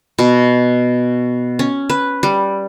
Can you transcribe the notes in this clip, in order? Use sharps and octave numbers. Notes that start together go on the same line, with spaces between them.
B2
C#4
B4
G3